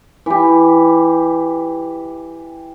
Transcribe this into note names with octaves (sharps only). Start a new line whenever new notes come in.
E3 G4